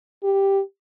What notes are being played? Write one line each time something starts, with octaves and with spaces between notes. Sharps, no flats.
G4